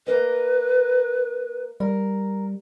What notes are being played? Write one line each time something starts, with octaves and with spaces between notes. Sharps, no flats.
A#3 A#4 B4 D#5
G3 A#4